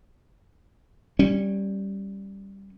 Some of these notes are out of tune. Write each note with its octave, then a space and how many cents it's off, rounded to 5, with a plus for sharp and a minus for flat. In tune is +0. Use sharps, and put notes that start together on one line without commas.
G3 +0 C#4 -20